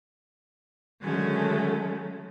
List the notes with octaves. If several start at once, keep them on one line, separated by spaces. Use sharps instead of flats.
D3 D#3 F#3 G#3 A3 C#4